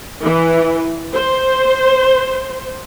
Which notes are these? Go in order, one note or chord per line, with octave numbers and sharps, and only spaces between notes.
E3
C5